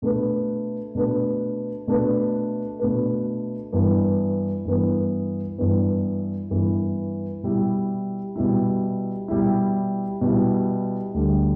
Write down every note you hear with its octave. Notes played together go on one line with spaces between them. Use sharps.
B2 A3 D4 B4
B2 A3 D4 B4
B2 A3 D4 B4
B2 A3 D4 B4
G2 E3 B3
G2 E3 B3
G2 E3 B3
G2 E3 B3
B2 G3 E4
B2 G3 E4
B2 G3 E4
B2 G3 E4
D2 D3 G3